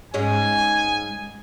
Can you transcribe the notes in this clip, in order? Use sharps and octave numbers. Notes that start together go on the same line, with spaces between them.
G#2 G#3 C#4 G#5